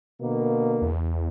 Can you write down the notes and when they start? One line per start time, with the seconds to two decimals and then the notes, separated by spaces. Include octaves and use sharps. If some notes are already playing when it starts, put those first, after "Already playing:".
0.21 B2 D3 A#3
0.82 E2